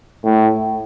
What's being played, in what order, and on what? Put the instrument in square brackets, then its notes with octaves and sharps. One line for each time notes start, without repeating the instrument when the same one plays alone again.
[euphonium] A2